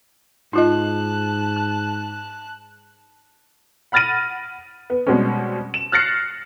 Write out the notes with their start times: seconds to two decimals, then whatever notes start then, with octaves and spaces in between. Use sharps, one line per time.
0.53 G#2 D#4 F4 D#5 A5 F#6
3.92 F#5 B5 F6 A6 A#6 D#7
4.90 B3
5.07 B2 G3 G#3 C4 C#4
5.74 E7
5.92 F6 F#6 A6 A#6 C7 C#7